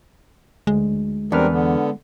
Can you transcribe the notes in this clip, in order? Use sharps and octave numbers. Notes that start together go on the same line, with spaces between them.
D2 G#3
E2 G3 C4 D4 A#4 B4 F6
D3 B3